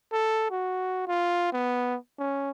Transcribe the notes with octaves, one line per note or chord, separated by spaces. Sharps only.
A4
F#4
F4
B3
C#4